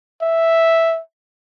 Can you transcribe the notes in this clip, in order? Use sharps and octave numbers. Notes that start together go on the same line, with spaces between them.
E5